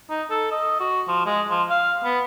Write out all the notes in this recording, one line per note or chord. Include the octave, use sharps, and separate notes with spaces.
D#4
A4
D#5
F#4
F3
G#3
F3
F5
B3